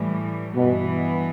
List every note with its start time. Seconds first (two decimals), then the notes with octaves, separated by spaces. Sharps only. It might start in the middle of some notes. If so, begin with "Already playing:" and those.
Already playing: A2 E3 G3
0.55 G2 B2 E3 B3